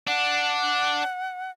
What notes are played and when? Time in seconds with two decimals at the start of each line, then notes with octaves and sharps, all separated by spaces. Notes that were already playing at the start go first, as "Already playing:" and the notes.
0.07 D4 F#5